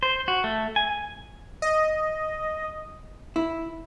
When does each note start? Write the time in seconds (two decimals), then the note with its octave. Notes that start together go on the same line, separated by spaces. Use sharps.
0.03 C5
0.28 F#4
0.44 A3
0.76 G#5
1.62 D#5
3.36 E4